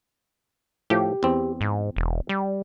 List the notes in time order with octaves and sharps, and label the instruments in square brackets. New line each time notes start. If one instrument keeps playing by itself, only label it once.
[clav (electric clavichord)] A2 F3 [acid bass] G4
[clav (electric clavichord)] E2 C4
[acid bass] G#2
E1
G3